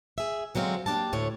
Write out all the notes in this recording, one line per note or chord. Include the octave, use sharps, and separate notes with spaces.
G#4 E5
D3 F#3 G#3 C4 F5
A#3 D4 G4 A5
D2 A2 C#5